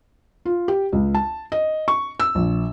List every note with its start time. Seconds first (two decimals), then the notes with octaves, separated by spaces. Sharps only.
0.45 F4
0.68 G4
0.92 C#2
1.15 A5
1.52 D#5
1.88 C#6
2.20 E6
2.35 A#1